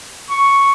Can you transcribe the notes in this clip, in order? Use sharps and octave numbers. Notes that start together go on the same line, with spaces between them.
C#6